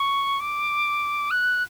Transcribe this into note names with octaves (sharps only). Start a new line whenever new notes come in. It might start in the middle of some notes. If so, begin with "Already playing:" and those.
Already playing: C#6
D6
F#6